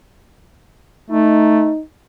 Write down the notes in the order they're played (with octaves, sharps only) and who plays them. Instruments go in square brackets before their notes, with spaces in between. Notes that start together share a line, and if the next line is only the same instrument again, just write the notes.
[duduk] A3 [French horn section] D#4